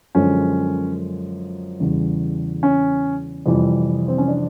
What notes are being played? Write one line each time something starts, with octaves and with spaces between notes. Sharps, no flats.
F#2 D3 F3 G#3 C#4
E2 C#3 E3 G3
C#4
F2 C3 E3 G3
C4
C#4
D4